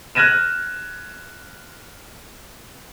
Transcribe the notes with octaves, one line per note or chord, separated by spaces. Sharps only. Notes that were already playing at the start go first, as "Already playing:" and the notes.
F6 F#6 G#6 A#6 D#7 E7